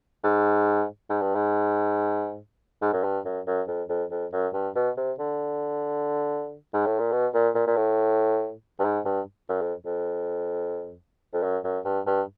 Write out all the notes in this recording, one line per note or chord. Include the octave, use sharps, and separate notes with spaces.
G#2
G#2
G2
G#2
G#2
F#2
G2
F#2
F#2
F2
F2
F2
F#2
G2
B2
C3
D3
G#2
A2
A#2
B2
A#2
A#2
A#2
A2
G2
G#2
G2
F#2
F2
F2
F2
F#2
F#2
G2
G2